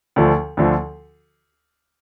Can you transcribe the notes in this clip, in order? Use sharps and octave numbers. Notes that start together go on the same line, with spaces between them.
D2 D3 F3
D2 D3 F3